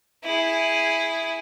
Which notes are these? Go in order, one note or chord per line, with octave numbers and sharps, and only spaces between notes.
E4 G#4